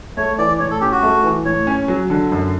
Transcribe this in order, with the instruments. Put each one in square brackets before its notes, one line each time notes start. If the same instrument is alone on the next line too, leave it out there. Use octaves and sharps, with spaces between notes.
[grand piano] A3 [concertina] C#5
[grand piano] E3 [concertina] D5
[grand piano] A2 [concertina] C#5
[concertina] A4
[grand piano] C#4 [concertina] G4
[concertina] F#4
[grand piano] A3
E3
[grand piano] A2 [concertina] C#5
[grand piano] C#4
F#3
D3
F#2